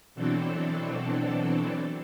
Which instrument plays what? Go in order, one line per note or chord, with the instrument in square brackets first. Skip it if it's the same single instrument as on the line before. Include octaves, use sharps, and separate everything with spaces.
[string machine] B2 E3 F#3 C4 D4 A4